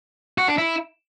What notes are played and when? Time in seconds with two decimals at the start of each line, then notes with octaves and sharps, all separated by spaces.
0.38 F#4
0.48 D4
0.58 E4